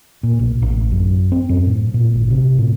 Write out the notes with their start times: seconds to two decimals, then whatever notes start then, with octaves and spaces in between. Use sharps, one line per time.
0.23 A#2
0.39 B1
0.62 A1
0.92 F#2
1.32 C4
1.49 F#2
1.67 A2
1.94 A#2
2.14 G#1
2.30 C3
2.59 A2